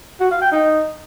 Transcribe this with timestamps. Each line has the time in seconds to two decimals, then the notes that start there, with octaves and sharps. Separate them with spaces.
0.20 F#4
0.31 F5
0.41 G5
0.52 D#4